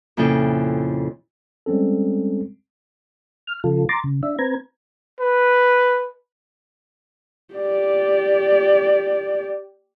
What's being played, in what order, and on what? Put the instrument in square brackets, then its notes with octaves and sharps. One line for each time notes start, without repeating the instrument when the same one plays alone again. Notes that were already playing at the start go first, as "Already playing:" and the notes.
[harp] F2 A#2 C#3 E4 A4 G5
[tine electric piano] G3 G#3 C4 C#4 A4
[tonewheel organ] F6
C#3 F3 F4 A4
A#5 C6 D6 A6
C#3
D4 E5
C4 B4 A#5 G#6
[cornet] B4
[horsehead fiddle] G4 D5